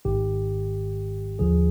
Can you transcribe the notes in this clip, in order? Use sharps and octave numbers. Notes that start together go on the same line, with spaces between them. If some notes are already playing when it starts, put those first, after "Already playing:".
G#1 G#2 D#3 G4
D#2 D3 F3 G#4